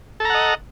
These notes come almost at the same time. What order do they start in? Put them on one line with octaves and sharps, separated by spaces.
A4 A#5 F#5 D#5